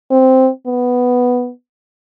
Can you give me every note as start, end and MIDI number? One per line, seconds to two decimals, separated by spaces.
0.11 0.50 60
0.67 1.51 59